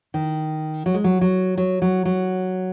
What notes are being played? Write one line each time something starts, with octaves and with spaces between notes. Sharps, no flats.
D#3
F#3
G#3
F#3
F#3
F#3
F#3
F#3